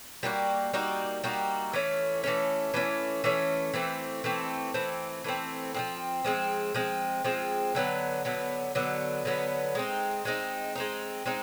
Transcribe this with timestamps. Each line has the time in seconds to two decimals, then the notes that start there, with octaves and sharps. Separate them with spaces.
0.23 G3 A#3 D#4 F#4
0.73 G3 A#3 D#4 F#4
1.24 G3 A#3 D#4 F#4
1.73 E3 A3 C#4
2.24 E3 A3 C#4
2.74 E3 A3 C#4
3.24 E3 A3 C#4
3.74 E3 A3 C4
4.24 E3 A3 C4
4.74 E3 A3 C4
5.24 E3 A3 C4
5.74 F3 G#3 C4
6.25 F3 G#3 C4
6.74 F3 G#3 C4
7.24 F3 G#3 C4
7.75 D3 F#3 B3
8.25 D3 F#3 B3
8.75 D3 F#3 B3
9.25 D3 F#3 B3
9.75 G#3 C4 D#4
10.25 G#3 C4 D#4
10.75 G#3 C4 D#4
11.26 G#3 C4 D#4